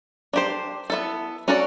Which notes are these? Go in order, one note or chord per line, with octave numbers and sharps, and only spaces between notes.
D4 G4 C5
B3 E4 A4
C#4 F#4 A4 D5